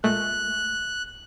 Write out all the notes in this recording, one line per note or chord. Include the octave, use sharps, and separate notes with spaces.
A#2 G#3 A3 F#6